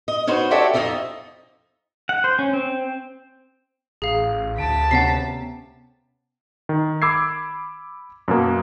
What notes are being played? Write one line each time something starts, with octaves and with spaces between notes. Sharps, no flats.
D#5
C#4 D#4 F#4 B4 C5
F#4 G4 A4 C#5 D5 E5
F2 D#4 F4 D#5 E5
F#5
C5
C#4
C4
A1 G#4 F5
D2 A5 B6 D7
C3 B3 C#4 F#5 A6 C7
D#3
B5 D6 E6 G#6 C7
F#2 B2 A#3